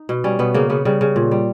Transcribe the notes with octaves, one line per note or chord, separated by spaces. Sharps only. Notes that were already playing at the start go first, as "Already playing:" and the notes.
Already playing: D#4
B2
G3 C#4
B2 B3
C#3 A#3
C#3 B3
C#3 G3
C#3
A#2
G3